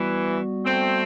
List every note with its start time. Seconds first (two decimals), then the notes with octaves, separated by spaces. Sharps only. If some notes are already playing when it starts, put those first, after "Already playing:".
Already playing: E3 G3 B3 F#4
0.65 A3 C4